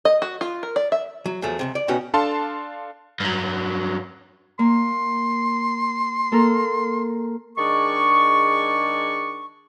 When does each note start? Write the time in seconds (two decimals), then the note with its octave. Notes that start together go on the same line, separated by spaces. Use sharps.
0.05 D#5
0.22 F#4
0.41 F4
0.63 A#4
0.76 D5
0.92 E5
1.26 F#3
1.42 E2 F3 F#3 A3
1.59 C#2 G2 C3
1.75 D5
1.88 B2 B3 C#4 D#4 F#4 G4
2.14 D4 A4 F5 A5 C6
3.20 G2 F#3
4.59 A#3 C6
6.32 A#3 A4 A#4
7.58 D#3 G#3 D4 G#4 D5 C#6